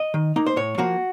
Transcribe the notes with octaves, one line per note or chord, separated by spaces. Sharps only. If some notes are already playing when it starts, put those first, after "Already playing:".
Already playing: D#5
D#3
A#3 D#4
C5
A2 C#5
F3 A#3 F#4